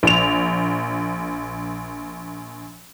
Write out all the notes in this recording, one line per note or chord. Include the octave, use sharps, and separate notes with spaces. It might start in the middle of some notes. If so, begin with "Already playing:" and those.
A#1 F7